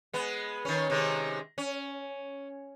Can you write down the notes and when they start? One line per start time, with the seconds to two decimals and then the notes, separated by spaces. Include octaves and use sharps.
0.13 G#3 B3
0.65 D#3 C#4
0.90 C3 D#3 G#3
1.58 C#4